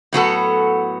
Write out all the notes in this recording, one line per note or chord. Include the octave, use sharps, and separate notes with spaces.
A2 F#3 B3 F#4 A4